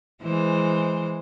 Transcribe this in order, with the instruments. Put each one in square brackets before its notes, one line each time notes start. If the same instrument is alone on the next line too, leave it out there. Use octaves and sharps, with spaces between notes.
[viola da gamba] E3 G#3 C5